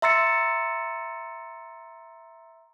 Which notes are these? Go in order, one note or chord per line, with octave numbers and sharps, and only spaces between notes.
E5 A#5 C6 E6 A6 C#7